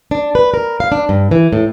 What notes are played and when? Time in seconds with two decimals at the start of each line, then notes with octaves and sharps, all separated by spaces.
0.11 D4
0.35 B4
0.54 A#4
0.80 F5
0.92 D4
1.09 G2
1.31 E3
1.53 A2